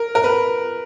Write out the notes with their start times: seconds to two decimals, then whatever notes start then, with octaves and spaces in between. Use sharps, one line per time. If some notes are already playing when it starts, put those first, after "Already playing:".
Already playing: A#4
0.15 A#4
0.24 B4